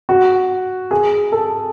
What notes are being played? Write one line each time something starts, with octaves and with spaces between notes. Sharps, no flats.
F#4
G#4
A4